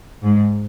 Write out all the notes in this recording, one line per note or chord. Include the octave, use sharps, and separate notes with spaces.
G#2